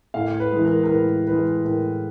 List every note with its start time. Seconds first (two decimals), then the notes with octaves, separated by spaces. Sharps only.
0.14 A2 F5
0.40 B4
0.52 E3 G#3
0.65 A#4
0.83 A#4
0.90 A2 B4
1.27 E3 G#3 B4
1.64 A2 A#4